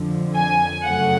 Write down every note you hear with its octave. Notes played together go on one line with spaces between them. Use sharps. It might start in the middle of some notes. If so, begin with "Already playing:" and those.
Already playing: F2 D3 F3
G#5
F#2 C#3 F#3 A3 F#5